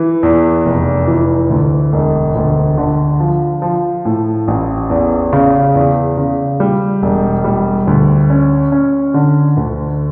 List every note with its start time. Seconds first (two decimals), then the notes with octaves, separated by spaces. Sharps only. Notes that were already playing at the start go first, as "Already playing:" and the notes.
Already playing: E3
0.23 E2
0.66 F1
1.08 E3
1.50 D2
1.93 E1
2.35 D2
2.77 D3
3.20 F3
3.62 F3
4.05 A2
4.48 A1
4.90 E2
5.33 C#3
5.75 E2
6.17 C#3
6.60 G3
7.02 E1
7.44 G3
7.87 D2
8.30 C#4
8.72 C#4
9.14 D3
9.57 D2